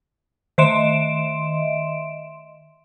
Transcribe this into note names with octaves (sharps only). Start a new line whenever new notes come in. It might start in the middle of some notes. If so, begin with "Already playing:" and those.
D#3 D#5 E5 C6 D7 E7